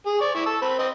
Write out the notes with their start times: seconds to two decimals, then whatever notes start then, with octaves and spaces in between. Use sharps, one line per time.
0.06 G#4
0.21 D5 C#6
0.35 E4 C#6
0.46 A5 E6
0.62 C4 B5
0.79 C4 D#5